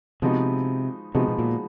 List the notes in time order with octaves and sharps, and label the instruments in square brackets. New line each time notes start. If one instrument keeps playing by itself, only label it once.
[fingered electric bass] C3 [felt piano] F3 G#3 B3 D#4 F#4
[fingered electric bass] C3 [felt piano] F3 G#3 B3 D#4 F#4
[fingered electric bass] B2
A#2